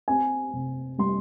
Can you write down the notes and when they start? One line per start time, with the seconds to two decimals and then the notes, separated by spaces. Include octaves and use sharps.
0.08 C4 G#5
0.53 C3
0.98 G3 C6